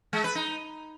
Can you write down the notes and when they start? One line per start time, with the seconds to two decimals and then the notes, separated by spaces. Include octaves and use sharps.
0.13 G#3
0.24 B4
0.35 D#4